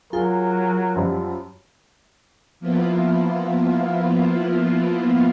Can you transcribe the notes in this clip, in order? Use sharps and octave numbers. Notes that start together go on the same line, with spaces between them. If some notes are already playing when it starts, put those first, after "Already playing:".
F#3 F4 G#4 A#4
F#2 F3 G3
F3 A#3 B3 E4 F4